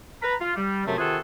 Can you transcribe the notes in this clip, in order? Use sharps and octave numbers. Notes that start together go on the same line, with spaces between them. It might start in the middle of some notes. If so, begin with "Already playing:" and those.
B4 A#5 B5
F4
G3
F#2 C3 F#3 A3 C4
C3 D#3 F4 F#4 G#4 A4